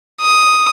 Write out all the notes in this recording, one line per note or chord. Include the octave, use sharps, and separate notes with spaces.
D#6